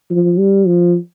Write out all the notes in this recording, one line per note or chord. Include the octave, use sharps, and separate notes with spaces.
F3
G3
F3